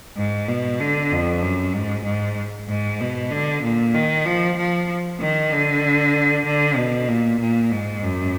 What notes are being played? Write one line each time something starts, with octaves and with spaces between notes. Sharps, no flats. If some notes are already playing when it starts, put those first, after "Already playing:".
G#2
B2
D3
F2
F#2
G#2
G#2
G#2
B2
D3
A#2
D#3
F3
F3
D#3
D3
D3
B2
A#2
A#2
G#2
F#2